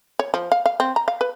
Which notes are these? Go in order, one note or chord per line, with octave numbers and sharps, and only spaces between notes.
C#5
F3
F5
F5
C4
A#5
F5
B4